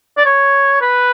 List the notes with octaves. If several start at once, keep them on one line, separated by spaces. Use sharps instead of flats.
D5
C#5
B4